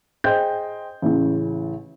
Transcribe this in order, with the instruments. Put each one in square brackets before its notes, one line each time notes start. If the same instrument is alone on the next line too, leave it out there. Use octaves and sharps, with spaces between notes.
[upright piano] G#4 C5 D#5 G5 G6
A1 C#3 E3